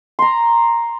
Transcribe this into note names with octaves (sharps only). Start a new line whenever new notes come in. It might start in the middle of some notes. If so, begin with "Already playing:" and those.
A#5 C6